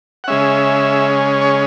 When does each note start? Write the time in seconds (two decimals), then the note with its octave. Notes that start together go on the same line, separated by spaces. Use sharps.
0.24 F#5
0.28 C#3 G#3 C#4 E5
1.41 C#5